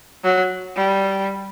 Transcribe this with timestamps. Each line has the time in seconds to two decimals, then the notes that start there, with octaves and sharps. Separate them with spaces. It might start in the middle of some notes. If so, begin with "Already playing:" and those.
0.24 F#3
0.76 G3